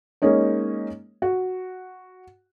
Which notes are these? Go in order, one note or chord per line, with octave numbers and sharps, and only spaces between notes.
G#3 A#3 C#4 D#4 C#5
F#4